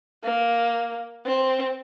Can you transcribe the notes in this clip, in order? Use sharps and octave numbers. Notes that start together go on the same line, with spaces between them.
A#3
C4